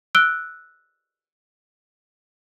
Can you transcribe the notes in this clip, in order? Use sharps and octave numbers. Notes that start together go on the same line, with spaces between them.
E6 F#6 D7 G7